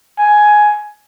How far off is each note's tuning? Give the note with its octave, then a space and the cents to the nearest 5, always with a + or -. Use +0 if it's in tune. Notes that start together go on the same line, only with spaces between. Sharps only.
G#5 +10